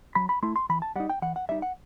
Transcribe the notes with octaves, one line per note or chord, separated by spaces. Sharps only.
F#3 B5
B5
A3 E4 C6
C6
E3 B5
A5
G3 D#4 F#5
G5
E3 F#5
F#5
G3 D#4 E5
F#5